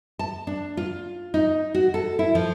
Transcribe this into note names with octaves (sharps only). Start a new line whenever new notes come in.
A5
D4
F4
D#4
F#4
A4
E4
F3